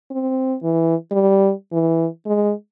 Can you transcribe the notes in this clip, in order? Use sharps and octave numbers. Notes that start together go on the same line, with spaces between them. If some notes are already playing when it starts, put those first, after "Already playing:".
C4
E3
G3
E3
G#3